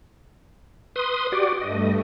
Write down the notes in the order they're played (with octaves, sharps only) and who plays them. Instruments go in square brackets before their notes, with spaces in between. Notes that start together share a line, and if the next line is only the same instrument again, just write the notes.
[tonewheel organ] B4 C6 D#6
F#4 G4 D5
[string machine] G2 A3 [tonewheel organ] D#5